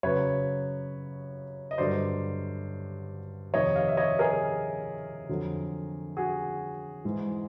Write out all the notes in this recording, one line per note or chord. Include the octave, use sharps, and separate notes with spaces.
F#2 C#3 F#3 B4 C#5
D#5
G2 D3 F#3 C5 D5
F2 C3 D#3 C#5 D#5
D#5 F5
E5
C#5 D#5
G#4 A#4
F2 D3 F#3
F#4 G#4
G#2 E3 G#3